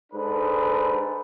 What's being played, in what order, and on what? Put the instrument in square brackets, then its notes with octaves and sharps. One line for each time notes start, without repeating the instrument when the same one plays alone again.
[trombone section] G#2 D4 A4 B4